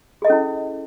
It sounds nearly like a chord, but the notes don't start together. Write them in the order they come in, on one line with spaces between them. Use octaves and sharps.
G#4 D#5 A4 C#4 E4